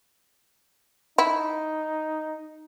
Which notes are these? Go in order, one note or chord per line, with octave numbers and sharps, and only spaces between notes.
D#4 E4